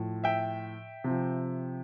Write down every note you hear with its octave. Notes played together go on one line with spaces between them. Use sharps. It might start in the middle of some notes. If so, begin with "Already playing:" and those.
Already playing: A2 F3
E5 G5
C3 F3